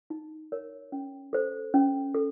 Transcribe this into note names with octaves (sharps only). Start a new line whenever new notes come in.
D#4
A#4 C#5
C#4
A4 C5
C#4
A4